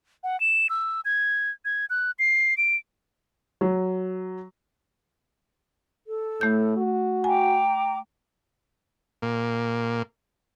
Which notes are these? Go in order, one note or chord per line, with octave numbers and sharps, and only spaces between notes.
F#5
E7
E6
G#6
G#6
F#6
C7
D7
F#3
A4
A2 A3 G6
F#4
G5 G#5 A#5 D6
A#2